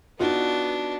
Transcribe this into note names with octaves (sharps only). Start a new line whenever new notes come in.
B3 D4 D#4 F4 F#4